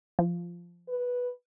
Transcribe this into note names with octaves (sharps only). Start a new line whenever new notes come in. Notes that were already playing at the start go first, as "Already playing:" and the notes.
F3
B4